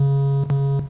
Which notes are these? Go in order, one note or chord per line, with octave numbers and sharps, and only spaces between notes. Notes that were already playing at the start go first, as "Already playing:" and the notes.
Already playing: C#3
C#3